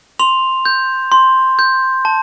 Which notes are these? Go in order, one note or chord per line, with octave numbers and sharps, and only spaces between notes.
C6 F7
G6
C6
G6
A5